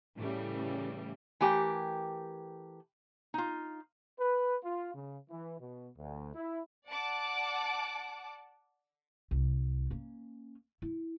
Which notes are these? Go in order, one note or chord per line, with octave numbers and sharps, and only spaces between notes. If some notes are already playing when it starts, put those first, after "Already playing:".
A2 C#3 E3 G3 A3
E3 A3 G4 A#4 C5 G5
D#4 F4
B4
F4
C#3
E3
B2
D2
E4
D5 F#5 A5 D6
C2
A#3 C#4
E4